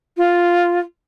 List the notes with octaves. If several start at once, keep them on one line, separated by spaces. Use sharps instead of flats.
F4